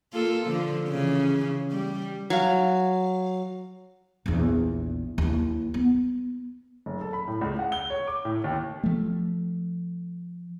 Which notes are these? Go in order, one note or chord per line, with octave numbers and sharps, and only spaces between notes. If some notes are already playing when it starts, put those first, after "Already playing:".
A#3 F4 A4
D3 F3
C#3 E3
G3
F#3 F5
A#1 E2
D#2 E4
B3
F#1
A4
B5
A2
C#2
F#5
G7
C#5
D6
A2
D#2
F3 A3